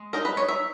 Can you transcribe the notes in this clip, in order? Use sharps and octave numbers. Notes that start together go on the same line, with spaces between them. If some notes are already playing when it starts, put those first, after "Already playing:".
Already playing: G#3
D#4 A#4
B4
D#4 C#5
E5